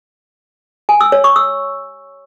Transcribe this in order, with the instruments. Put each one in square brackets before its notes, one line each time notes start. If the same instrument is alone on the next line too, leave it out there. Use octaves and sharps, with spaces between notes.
[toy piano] G#5
E6
C#5
C#6
E6